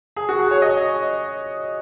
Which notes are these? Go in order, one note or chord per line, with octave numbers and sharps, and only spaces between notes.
G#4
F#4
G#4
C#5
D#5